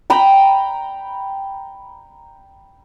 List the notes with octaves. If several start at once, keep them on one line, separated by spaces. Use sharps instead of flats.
G5 A#5 B5